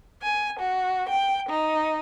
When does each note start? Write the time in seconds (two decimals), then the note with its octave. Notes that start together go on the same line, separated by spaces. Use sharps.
0.22 G#5
0.61 F#4
1.09 G5
1.50 D#4